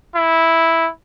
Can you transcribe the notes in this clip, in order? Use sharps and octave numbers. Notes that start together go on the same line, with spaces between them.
E4